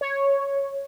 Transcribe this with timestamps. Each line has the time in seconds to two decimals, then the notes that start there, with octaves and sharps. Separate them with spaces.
0.01 C#5